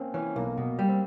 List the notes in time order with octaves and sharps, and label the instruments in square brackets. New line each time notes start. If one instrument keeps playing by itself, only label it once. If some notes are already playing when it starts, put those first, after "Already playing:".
Already playing: [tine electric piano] A#3 C4 C#4
[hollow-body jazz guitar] E3 [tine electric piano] C#4
[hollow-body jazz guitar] B1 [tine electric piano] A#3
[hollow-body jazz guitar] B2
G3
[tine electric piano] C4